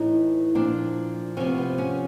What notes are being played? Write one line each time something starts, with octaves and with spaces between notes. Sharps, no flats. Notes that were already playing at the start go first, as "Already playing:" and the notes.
Already playing: A2 E3 D#4
A#2 F3 D4
C3 F3 C#4
B3
B3
C#4